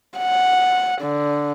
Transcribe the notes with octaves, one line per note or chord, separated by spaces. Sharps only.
F#5
D3